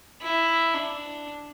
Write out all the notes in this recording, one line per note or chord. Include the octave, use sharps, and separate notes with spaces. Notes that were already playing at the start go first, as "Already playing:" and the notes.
E4
D4